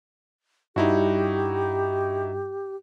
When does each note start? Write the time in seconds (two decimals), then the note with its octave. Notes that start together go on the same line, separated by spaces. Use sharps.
0.76 G2 D#4 E4 F#4 G4